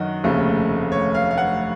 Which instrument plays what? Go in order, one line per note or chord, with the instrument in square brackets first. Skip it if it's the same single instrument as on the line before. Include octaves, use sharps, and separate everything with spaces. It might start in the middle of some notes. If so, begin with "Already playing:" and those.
Already playing: [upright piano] F#2 D#3 D#5 F#5
F1 D#2 C#3 A3
C#5
F5
F5
F#5